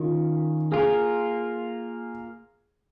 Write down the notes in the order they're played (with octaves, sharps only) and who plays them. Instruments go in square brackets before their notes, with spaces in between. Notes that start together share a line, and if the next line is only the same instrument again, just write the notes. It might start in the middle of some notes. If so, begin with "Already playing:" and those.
Already playing: [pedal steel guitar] D#3 C#4 [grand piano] F4
[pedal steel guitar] A#3 F4 A#4 [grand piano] G#4